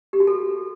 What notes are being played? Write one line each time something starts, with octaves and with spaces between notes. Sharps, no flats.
G4
F#4
A4